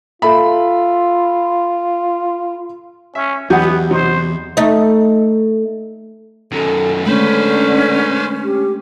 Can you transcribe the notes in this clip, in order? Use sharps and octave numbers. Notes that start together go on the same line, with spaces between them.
F4 A4 E5 B5
C#4 E5
E2 F#3 B3 D#4 G4 F#5 G#5
C3 F#3 D#4 C5
A3 D#4
F#2 D#3 A4
D3 G#3 A3 C#4 D4 B4 C5
G4